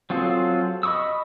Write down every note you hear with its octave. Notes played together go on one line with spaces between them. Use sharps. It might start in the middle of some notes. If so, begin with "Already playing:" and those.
F#3 C4 F4 G#4 A4
D#5 B5 C#6 D#6 E6